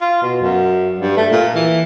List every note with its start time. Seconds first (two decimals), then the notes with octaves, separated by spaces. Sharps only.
0.01 F4
0.22 B2
0.42 F#2
0.99 G2
1.17 A3
1.32 A#2
1.55 E3